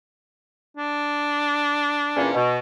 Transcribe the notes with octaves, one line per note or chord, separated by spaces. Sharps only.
D4
E2 A#2 C#4
B2